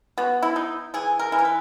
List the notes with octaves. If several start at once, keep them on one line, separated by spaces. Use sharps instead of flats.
B3 F#4
E4
D#4
E3 G#4
A#4
E3
A#4
B4